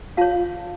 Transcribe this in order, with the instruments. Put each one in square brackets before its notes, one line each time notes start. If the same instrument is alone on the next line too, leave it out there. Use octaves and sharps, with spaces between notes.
[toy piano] F4 C#5 F5 A5